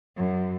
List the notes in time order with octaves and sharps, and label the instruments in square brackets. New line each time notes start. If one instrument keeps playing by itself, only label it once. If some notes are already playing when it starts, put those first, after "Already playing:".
[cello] F#2